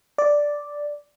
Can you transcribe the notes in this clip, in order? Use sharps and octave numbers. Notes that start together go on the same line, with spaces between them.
D5